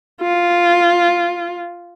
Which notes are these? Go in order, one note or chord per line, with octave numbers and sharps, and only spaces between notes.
F4